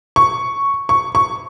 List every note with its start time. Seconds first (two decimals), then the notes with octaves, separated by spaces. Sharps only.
0.16 C#6
0.89 C#6
1.15 C#6